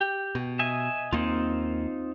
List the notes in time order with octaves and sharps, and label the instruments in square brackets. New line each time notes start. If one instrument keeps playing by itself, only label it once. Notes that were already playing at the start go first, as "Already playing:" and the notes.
[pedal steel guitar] G4
[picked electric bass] B2
[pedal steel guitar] D#5 E5 G#5
[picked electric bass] D#2 A#3 [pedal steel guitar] C4 D#4 F4